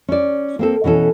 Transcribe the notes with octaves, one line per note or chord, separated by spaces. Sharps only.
C#4 D5
A#3 C4 A4
B2 E3 C#4 A4